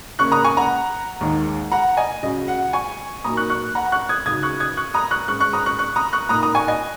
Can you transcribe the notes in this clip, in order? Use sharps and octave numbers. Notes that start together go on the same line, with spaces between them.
C#3 A#3 C#4 C#6 F#6
A#5 D#6
G#5 C#6
F#5 A#5
D#2 D#3 G#3 D#4
F#5 A#5
D#5 G#5
C#2 C#3 F#3 C#4 D#5
F#5
G#5 C#6
A#2 F#3 A#3 D#4 A#5 D#6
C#6 F#6
C#6 F#6
F#5 A#5
C#6 F#6
D#6 G#6
C#2 C#3 F#3 D#4 D#6 G#6
C#6 F#6
D#6 G#6
C#6 F#6
A#5 D#6
C#6 F#6
G#2 G#3 C#4 C#6 F#6
C#6 F#6
A#5 D#6
C#6 F#6
C#6 F#6
A#5 D#6
C#6 F#6
A#2 A#3 D#4 A#5 D#6
A#5 D#6
G#5 C#6
D#5 G#5